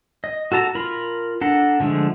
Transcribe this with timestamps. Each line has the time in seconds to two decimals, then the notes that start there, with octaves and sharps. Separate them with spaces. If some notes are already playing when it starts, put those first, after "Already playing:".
0.24 D#5
0.52 F#4 A4 A5 A#5
0.75 F4 A#4 B5
1.41 D4 A4 F#5 A#5
1.80 D3 F3 G#3 A3